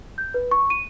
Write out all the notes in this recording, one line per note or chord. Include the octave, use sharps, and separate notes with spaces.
G6
B4
C#6
D#7